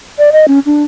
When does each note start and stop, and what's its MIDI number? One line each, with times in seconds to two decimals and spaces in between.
0.19 0.30 74
0.32 0.48 75
0.48 0.59 61
0.66 0.83 62